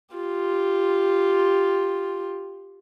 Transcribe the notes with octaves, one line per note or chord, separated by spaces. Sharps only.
F4 G4